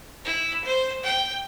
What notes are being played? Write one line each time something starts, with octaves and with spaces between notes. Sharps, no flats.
E4
C5
G5